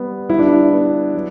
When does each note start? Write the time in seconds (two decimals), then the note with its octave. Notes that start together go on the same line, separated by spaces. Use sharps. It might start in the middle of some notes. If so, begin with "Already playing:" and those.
Already playing: G3 B3
0.29 G3 E4
0.39 D4
0.49 E4
0.72 B3
1.14 F#3